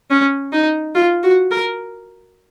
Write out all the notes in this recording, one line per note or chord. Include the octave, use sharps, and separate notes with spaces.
C#4
D#4
F4
F#4
A#4